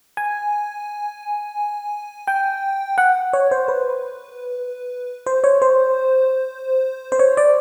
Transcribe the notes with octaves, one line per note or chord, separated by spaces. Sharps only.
G#5
G5
F#5
C#5
C5
B4
C5
C#5
C5
C5
C#5
D5